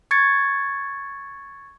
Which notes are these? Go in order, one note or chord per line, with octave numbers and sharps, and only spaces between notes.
C#6 G#6 A6 C#7